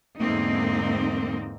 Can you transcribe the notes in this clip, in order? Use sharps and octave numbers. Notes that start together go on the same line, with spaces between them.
E2 G#2 D3 A#3 C4 D#4